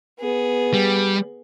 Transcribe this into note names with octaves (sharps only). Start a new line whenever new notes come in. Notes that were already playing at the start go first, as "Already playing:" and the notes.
B3 G#4
G3